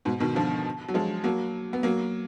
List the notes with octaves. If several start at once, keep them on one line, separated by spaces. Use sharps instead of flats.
G#2 B2
B2 D#3
D3 F3
F#3
F3 G#3
F#3 A#3
B3
F#3 A#3